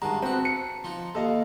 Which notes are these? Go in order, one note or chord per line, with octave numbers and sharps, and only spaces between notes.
G2 D#3 G#3 F#4 A5 A#5
B3 C4 F#4 F#5 B5
C#7
F3 D#4
D#2 A4 D#5 F5